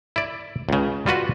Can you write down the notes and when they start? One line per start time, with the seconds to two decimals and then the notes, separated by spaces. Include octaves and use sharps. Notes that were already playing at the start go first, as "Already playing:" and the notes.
0.16 E4 D5
0.69 C#2 C#3
1.06 G3 F4 F#4 B4